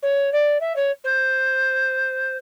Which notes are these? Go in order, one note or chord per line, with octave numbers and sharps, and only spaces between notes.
C#5
D5
E5
C#5
C5